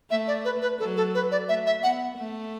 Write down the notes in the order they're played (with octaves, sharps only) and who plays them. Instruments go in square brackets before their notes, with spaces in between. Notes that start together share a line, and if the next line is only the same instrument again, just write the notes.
[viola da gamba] A3 [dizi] E5
[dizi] D5
B4
B4
[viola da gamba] F#3 [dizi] A4
[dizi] A4
B4
D5
[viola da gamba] A3 [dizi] E5
[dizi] E5
[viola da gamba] B3 [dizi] F#5
[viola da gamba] A3